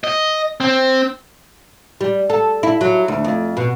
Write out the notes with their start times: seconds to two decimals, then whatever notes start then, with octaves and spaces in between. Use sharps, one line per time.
0.04 D#5
0.60 C4
2.01 G3
2.30 A4
2.63 E4
2.81 F#3
3.08 D2
3.24 F2
3.57 B2